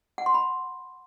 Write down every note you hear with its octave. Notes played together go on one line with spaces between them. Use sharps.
F#5
C6
B5